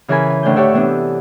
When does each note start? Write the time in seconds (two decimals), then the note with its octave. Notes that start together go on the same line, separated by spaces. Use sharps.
0.08 C#3 E3 G#4 A#4 G#5 B5
0.30 G#5
0.43 D2 A2 D4 G6
0.56 G4 A4 C#5 D5 E5 F#5
0.73 C3 E3 B3 D4